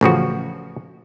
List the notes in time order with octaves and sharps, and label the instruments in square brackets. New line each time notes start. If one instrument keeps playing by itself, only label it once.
[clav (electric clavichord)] A1 C#3 F3 F#4